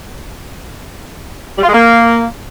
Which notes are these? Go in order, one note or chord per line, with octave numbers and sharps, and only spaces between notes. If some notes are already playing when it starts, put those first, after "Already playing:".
G3
F4
G#3
A#3